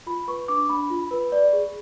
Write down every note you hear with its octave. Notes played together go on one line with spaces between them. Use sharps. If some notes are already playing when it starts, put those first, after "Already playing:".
F4 B5
B4 C#6
D4 D6
D4 B5
F4
B4
D5
G#4